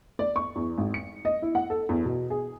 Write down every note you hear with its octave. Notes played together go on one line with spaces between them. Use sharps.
D5
C#6
E2
G#1
C#7
D#5
E4
F#5
A4
E2
B2
G#4